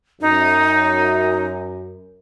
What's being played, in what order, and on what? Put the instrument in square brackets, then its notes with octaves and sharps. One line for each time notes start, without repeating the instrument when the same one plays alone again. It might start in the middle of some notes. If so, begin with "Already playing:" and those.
[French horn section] F#2 [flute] D#4